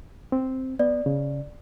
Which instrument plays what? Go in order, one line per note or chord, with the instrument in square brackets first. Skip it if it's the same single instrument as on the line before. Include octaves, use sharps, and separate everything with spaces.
[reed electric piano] C4
[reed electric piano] B3 [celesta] D5
[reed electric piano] C#3